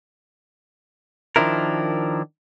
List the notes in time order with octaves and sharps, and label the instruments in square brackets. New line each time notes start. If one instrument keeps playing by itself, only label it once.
[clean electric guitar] D#3 F3 D4 E4 A#4